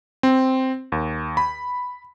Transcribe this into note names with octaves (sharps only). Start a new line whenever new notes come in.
C4
D#2
B5